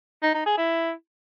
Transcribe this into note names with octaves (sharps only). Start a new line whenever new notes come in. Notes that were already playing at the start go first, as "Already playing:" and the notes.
D#4
D#4
G#4
E4